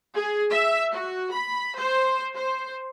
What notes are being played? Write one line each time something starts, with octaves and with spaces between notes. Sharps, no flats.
G#4
E5
F#4
B5
C5
C5